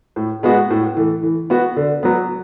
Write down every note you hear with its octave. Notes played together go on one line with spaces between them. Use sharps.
A2
G#3 B3 F#4
A2
E3 A3
E3
B3 F#4
D3
F#3 B3